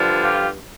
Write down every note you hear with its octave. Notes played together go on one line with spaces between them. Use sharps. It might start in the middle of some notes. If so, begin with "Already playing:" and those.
Already playing: G2 D3 F3
F4 G4